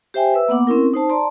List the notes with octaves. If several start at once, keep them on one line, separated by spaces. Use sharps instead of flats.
G4 C5 E5 G5 G#5
B4 E5 E6
A#3 B3 F#5 D6
C4 C#4 E4 A#4
D#4 C5 A5
D5 A5 A#5 C6